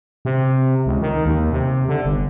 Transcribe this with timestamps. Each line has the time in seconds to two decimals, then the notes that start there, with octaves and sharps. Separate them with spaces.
0.25 C3
0.86 C#2
1.02 D#3
1.26 D#2
1.52 C3
1.88 D3
2.05 G1